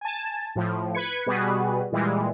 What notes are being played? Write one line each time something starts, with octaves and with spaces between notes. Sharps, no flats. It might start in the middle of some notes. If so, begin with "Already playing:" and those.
G#5 A5
A2 F3
B4 G#6 C#7
B2 G3 B3 F#4 G#4 B4
A#2 E3 G3 G#3